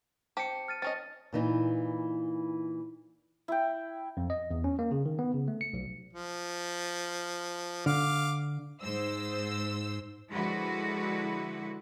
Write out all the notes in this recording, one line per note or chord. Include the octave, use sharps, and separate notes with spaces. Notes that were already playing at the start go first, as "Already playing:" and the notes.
C4 G4 A5 C#7
F6 A6 D#7
C4 C#4 D#5 A6
A#2 E3 D#4
E4 G5
F2
D#5
E2
C#4
A#3
C#3
D#3
B3
C#3
A3
C#7
B1
F3
D3 F5 D6
G#2 C5 E6
D3 F3 G#3 E4 F#4 B4